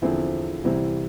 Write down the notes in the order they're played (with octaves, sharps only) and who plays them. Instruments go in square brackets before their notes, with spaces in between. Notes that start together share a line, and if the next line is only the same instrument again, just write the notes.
[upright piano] E2 D3 F3 C4 E4
C2 C3 E3 C4 E4